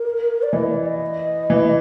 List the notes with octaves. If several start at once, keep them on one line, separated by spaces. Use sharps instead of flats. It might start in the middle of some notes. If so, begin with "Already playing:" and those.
Already playing: A#4
D5
E3 D#5
D5
D#5
E3